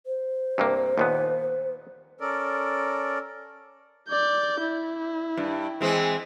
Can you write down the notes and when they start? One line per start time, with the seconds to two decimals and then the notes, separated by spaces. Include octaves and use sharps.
0.06 C5
0.58 G2 C3 A#3
0.98 D#2 A#2 B3
2.21 C#4 A4 A#4 D5
4.09 D5 G6
4.61 E4
5.37 G2
5.81 E3 G#3 C4